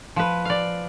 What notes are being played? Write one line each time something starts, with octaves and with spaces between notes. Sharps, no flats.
F3 B4
D5 F5